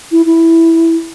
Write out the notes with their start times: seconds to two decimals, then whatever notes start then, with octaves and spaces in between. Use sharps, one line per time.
0.12 E4
0.26 E4